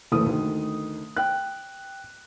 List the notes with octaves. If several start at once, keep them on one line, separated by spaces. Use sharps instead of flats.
F#1 E3 A3 D#6
D2 D#3
G5 F#6